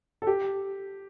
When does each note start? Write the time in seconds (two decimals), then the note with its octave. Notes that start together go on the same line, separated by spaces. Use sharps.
0.22 A4
0.27 G4